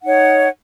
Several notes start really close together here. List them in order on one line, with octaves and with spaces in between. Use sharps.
F#5 D#4 C#5